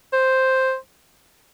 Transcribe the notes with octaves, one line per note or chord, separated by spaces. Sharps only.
C5